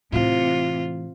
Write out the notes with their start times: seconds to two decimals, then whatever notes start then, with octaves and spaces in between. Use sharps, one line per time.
0.12 A2 C3 E3 F4